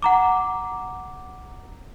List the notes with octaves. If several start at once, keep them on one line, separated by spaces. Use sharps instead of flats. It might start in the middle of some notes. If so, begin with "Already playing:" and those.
F#5 A#5 D6